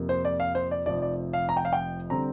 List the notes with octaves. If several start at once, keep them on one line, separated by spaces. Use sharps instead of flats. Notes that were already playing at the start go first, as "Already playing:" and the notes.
Already playing: F2 C3 A#3
C5
D5
F5
C5
D5
F1 F2 F3 D5
D5
F5
A#5
G5
F5
G5
D3 G3 C4 A#5